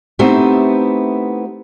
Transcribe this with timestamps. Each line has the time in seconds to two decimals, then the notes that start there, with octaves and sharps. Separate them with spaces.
0.19 A3 B3 C4 D#4 E4 G4